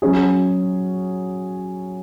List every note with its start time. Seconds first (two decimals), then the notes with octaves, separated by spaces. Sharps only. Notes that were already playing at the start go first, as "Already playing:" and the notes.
0.02 F#3 C#4 G#4